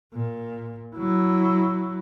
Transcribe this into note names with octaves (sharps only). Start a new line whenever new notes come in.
A#2
F#3 E4